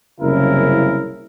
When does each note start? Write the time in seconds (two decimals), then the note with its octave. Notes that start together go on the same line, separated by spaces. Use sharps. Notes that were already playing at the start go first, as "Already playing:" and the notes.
0.20 F#1 C2 C#3 E4 A#4